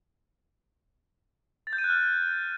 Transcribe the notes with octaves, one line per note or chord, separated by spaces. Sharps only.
A6
G6
D#7
F#6
F6